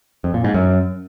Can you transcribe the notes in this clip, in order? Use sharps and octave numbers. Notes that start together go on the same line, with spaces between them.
F2
A#2
G#2
F#2